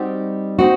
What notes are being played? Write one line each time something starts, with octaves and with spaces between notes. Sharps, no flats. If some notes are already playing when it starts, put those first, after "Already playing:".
Already playing: G3 C4 D#4 F#4
C4 D#4 F#4